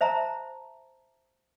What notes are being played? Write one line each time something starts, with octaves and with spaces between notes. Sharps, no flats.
C5 E5 A5 A#5